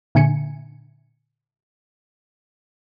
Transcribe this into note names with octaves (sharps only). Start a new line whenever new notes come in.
A#2 D3 G#5 C#7